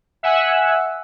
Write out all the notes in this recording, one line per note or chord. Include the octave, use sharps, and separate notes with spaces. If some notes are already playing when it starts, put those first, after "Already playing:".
E5 F#5 G#5 E6 F#6